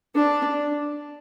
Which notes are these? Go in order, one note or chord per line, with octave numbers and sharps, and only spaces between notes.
D4